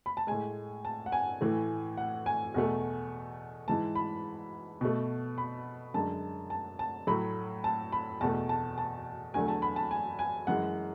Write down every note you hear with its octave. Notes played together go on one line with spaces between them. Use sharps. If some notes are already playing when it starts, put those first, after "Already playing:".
B5
A5
A2 G#3 G#5
A5
F#5
G#5
A2 E3 A3
F#5
G#5
E2 B2 A3
G#2 E3 G#3 A5
B5
B2 A3
B5
F#2 D3 G#3 A5
A5
A5
A2 F#3 A3 B5
A5
B5
E2 B2 A3 A5
A5
A5
E2 D3 F#3 A3 G#5
A5
B5
A5
G#5
G#5
F#2 E3 G#3 F#5